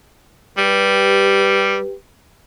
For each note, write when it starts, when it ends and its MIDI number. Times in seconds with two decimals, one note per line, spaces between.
0.57 1.81 55
0.57 1.93 67
0.57 1.93 71